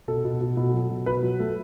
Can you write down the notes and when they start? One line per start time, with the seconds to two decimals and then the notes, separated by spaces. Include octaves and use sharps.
0.08 B2 A4
0.25 B2
0.41 B2
0.57 B2
0.73 F#3
0.91 B2
1.06 B2 B4
1.22 F#3
1.39 A3